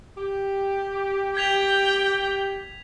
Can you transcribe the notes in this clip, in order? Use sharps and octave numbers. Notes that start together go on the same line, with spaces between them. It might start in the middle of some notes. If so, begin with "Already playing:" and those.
G4
G5 G#6 B6 F7